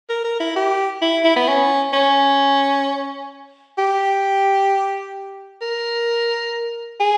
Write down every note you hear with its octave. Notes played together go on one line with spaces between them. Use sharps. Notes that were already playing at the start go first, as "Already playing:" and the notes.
A#4
A#4
E4
G4
E4
E4
B3
C#4
C#4
G4
A#4
G#4